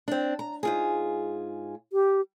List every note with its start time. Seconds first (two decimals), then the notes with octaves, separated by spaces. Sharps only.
0.08 C4 D4
0.39 A#5
0.63 G#2 F4 G#4
1.93 G4